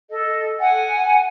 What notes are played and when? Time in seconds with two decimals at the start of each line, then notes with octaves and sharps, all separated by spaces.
0.10 A4 D#5
0.60 F#5 G#5